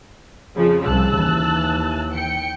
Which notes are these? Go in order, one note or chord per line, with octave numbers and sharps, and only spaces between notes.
F2 C#3 F3
C2 C#3 F3 A5 E6 F#6
D#2 E3
G5 C#7